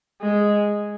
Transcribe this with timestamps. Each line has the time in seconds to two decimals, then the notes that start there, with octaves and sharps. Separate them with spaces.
0.21 G#3